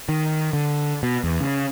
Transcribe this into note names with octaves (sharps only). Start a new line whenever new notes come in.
D#3
D3
B2
E2
C#3